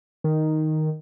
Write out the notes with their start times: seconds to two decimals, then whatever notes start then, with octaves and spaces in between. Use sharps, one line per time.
0.24 D#3